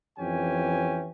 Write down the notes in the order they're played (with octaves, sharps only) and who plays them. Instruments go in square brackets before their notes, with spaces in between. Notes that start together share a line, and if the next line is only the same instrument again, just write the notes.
[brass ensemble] F2 E3 C#4 G4 G#5